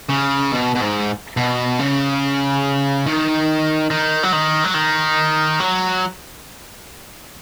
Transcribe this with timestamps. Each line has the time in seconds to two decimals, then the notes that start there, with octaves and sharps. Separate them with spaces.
0.10 C#3
0.52 B2
0.75 B2
0.81 G#2
1.37 B2
1.80 C#3
3.06 D#3
3.90 D#3
4.23 F#3
4.33 D#3
4.64 F#3
4.74 D#3
5.60 F#3